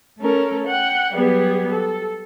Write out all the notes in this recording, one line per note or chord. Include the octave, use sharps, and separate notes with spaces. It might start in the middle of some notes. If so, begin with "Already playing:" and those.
A3 C#4 A4 A#4
F#5 G5
F#3 G3 B3 G#4
A4